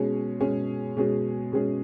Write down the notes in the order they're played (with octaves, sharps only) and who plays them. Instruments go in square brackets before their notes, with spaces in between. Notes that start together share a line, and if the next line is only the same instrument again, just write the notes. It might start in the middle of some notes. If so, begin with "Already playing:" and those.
Already playing: [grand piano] B2 G#3 C#4 G#4
B2 G#3 C#4 G#4
B2 G#3 C#4 G#4
B2 G#3 C#4 G#4